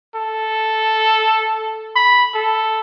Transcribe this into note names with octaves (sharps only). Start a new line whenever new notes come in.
A4
B5
A4